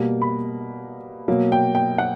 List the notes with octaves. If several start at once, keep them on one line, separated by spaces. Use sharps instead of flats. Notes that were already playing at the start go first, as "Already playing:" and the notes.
Already playing: B2 G3 A#3
B5
B2 F#3 A#3
G5
G5
F#5